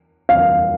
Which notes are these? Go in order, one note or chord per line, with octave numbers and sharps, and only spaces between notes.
F5